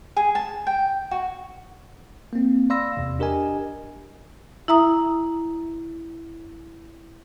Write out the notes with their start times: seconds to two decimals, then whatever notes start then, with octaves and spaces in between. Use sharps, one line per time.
0.17 G#4
0.35 A5
0.67 G5
1.11 F#4
2.33 A#3 C4
2.70 D5 F5 B5 C6 E6 A#6
2.97 E2 C3
3.19 D4 G4 A#4 D#5 G#5
4.68 E4 E5 A#5 D#6